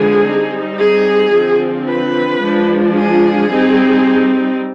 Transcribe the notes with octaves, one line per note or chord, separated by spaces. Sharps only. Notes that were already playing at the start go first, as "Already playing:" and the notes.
Already playing: D3 F3 G#3 B3 G#4
G3 C4 D#4
G#4
D3 F3 C4
B4
F3 G#3 D4
G#4
G3 C4 D#4